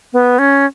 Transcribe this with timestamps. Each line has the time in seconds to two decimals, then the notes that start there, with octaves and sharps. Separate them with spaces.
0.13 B3
0.39 C#4